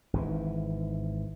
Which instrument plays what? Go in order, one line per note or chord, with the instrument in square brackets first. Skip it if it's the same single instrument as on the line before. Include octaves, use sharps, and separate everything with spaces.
[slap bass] G#1 G#2 D#3 E3